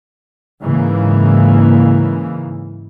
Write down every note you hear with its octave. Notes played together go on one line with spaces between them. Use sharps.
G#2 C#3 E3 A#3